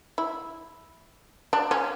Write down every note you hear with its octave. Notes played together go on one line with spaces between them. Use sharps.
E4
D4
C#4